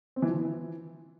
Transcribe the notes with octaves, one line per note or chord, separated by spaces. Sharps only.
C4
E3
F3
E3